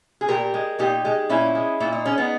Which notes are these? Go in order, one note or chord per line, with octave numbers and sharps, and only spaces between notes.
G#4
A#2 G4 A#4
G#3
A#2 D#4 G4
G#3
A#2 C#4 E4
G#3
A#2 E4
D#4
G#3 C#4
B3 D#4